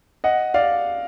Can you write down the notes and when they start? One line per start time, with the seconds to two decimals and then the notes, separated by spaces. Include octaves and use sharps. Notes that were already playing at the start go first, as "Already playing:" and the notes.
0.24 D#5 F#5
0.54 D5 F5